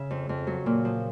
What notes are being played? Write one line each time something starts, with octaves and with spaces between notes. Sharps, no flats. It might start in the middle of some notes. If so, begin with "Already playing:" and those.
Already playing: C#3 E5
F2
F2
F#3
A#2
F3